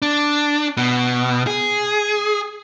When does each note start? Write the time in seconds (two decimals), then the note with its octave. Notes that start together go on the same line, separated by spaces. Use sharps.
0.02 D4
0.77 B2
1.47 G#4